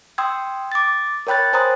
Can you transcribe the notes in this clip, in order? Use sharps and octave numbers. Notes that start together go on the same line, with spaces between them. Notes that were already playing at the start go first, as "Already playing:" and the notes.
G5 C6 D#6 E6 G#6
D6 A6
A#4 C#5 G5 B5 F#6 A6
C5 G#5 A#5 C6 D#6 F#6